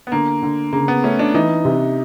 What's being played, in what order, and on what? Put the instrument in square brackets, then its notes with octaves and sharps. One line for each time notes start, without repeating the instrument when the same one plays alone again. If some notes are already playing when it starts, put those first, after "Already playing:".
[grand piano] B3
[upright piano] D3 [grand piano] A#3
[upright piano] D3
[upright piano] C#3 [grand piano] A#3
[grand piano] B3
[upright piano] A3 [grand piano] C#4
[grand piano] D4
[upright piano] E3 [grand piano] D#4
[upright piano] C3